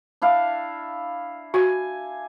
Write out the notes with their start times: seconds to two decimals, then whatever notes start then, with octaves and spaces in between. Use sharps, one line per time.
0.22 D4 E4 F5
1.54 F#4 G#5